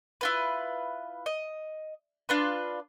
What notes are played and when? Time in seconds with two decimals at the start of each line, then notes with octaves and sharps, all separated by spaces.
0.21 E4 F4 B4
1.26 D#5
2.29 D4 F4 B4